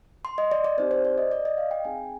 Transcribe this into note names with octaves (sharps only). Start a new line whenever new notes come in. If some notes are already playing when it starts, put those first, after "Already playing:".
C6
D#5
D5
D5
C4 D#4 G4 C5
C5
D5
D#5
D5
D#5
F5
G5
C4 D#4 G#4 G#5